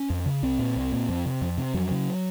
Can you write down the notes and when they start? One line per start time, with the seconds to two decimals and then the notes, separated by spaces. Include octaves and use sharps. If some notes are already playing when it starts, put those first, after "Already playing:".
Already playing: C#4
0.10 F2
0.26 C#3
0.43 C2 C4
0.59 A#2
0.76 C2
0.92 A#2
1.09 F2
1.26 C3
1.41 F2
1.58 C3
1.74 F2 F#3
1.91 C#3